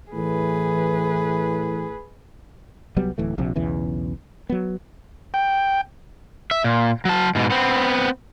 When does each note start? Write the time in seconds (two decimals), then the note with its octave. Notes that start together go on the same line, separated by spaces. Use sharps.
0.13 A2 E3 G#4 B4
2.96 C2 F#3 G3 B3
3.18 D1 E3 A3
3.38 A#1 C3 F3
3.56 B1 E2 C#3 E3
4.50 F#3 B3
5.34 G5
6.51 E5
6.64 A#2
7.05 F#3 A5
7.35 G#2 B2
7.51 B3 C4